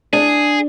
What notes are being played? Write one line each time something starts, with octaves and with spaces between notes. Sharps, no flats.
D4 G#4